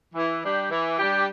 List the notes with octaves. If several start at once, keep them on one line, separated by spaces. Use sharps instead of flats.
E3
G3 D4 G4
E3
G3 D4 G4